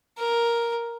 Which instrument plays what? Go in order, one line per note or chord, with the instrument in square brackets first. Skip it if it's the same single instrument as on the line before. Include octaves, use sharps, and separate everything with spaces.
[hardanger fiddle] A#4